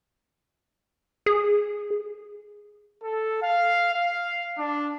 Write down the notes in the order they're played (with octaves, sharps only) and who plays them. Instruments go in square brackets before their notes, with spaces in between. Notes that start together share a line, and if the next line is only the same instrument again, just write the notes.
[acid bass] G#4
[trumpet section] A4
F5
F5
D4